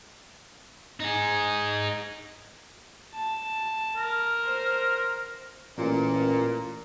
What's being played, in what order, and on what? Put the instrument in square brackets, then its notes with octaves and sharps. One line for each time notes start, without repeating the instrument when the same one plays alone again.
[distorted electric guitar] D#4 G#4
[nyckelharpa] A5
[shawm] A#4
[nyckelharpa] C5
[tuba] A1 [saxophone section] A#2